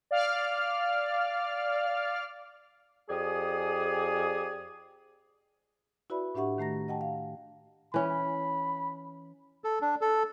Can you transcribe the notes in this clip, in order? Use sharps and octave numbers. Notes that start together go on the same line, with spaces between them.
D5 F5 F6
F2 G4 G#4 D5 G#5 D#6
E4 F#4 B4 D5 E5 B5
A2 D4 G4 E5 F#5 C#6
D#3 A3 A#5 A#6
D#5 F#5 G5 A5
F5
E3 C#4 B5
A4
D4
A4